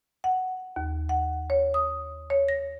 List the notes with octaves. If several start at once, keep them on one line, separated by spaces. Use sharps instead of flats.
F#5
D#2
F#5
C#5
D#6
C#5
A#6